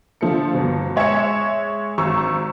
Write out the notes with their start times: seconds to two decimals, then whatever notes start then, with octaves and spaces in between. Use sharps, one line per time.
0.21 D3 F3 A3 C#7
0.53 G1 B2
0.96 G#3 C#5 E5 G#6 C#7
1.98 G#1 A#5 C#6 E6